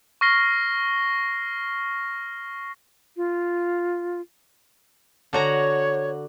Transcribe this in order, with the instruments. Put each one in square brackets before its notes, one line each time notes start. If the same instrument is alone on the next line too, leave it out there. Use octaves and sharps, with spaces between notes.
[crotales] C#6 F6 A#6 C7 G7
[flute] F4
[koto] D3 F#4 A#5 [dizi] C#5